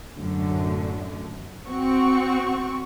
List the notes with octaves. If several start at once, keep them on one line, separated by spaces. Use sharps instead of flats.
F#2 A2 D3
C4 F#4 C#6